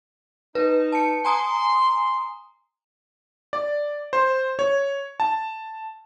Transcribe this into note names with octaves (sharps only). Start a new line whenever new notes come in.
D#4 B4
A5 C#7
G#5 A#5 C6 D#6
D5
C5
C#5
A5